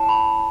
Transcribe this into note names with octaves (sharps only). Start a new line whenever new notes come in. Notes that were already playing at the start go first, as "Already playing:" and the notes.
Already playing: E4 C#5 A5
B5